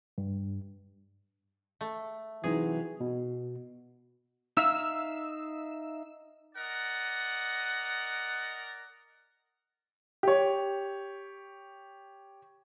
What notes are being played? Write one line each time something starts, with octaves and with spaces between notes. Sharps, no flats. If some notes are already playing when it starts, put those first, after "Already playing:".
G2
A3
C3 E3 F#3 D#4 G#4
B2
D#4 E5 F5 E6
A#4 D5 D#5 F#5
G4 C#5